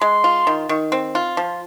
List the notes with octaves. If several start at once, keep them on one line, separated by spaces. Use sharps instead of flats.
G#3 C6
F4
D#3
D#3
C4
F4
F3